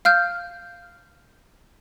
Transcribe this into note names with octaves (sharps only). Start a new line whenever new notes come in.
F5 F6 G6